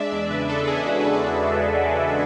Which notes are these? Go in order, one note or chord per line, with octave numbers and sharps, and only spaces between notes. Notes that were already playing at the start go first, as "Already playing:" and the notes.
Already playing: G#3 D4 D5 E5
E2 D5
C#3 B4
D4 A4
G#3 G#4
E2 F#4
C#3 B4
G#4